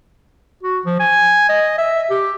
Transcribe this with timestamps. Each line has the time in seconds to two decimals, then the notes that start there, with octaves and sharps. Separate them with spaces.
0.64 F#4
0.86 F3
1.00 G#5
1.49 D#5
1.78 E5
2.10 G4